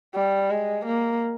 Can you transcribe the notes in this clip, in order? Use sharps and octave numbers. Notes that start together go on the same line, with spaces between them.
G3
G#3
A#3